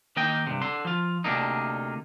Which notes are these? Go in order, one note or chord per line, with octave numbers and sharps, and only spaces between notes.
D#3 A#3 D#4 D#5 G5
G2 C3
D3 C6
F3 F4
D2 C3 A#3 D4 D#4